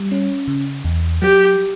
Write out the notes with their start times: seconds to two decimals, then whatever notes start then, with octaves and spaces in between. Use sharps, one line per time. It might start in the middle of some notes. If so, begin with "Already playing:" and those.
Already playing: G3
0.12 C#4
0.48 C#3
0.85 E2
1.22 F#3 G4